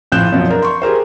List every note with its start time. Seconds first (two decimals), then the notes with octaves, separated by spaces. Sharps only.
0.12 A#1 A2 F3 F#6 G6 E7
0.32 F#2 B2 F3
0.47 D4 A#4
0.62 C6 C#6
0.82 G4 G#4 A#4 C5